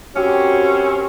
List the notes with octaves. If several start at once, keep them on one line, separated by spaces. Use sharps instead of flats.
F#2 C4 C#4 F#4 G4